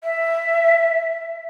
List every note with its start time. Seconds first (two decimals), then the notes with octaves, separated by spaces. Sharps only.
0.03 E5